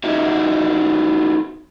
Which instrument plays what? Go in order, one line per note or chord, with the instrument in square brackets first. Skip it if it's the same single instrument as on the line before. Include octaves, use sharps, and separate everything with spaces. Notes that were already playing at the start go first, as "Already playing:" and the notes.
[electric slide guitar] D#4 F#4 G4 D#5 E5